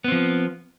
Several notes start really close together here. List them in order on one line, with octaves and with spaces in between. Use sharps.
B3 C4 F3